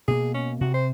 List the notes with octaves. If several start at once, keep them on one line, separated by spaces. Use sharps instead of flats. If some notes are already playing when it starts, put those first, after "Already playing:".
B2 A#3 G#4
C#4
C3 F#4
C5